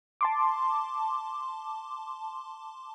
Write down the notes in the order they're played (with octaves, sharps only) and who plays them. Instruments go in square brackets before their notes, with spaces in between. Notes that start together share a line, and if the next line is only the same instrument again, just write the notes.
[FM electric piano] A5 C6 D6